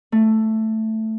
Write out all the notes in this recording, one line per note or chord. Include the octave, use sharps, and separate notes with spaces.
A3